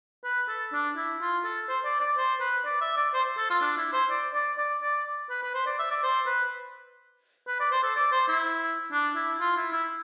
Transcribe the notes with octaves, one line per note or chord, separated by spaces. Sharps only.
B4
A4
D4
E4
F4
A4
C5
D5
D5
C5
B4
D5
E5
D5
C5
A4
F4
D4
E4
C5
D5
D5
D5
D5
B4
B4
C5
D5
E5
D5
C5
B4
B4
D5
C5
A4
D5
C5
E4
D4
E4
F4
E4
E4